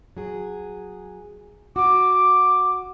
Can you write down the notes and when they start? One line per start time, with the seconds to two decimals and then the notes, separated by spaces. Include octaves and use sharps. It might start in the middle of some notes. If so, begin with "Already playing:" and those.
0.17 F#3 G#4
1.76 F#4 D6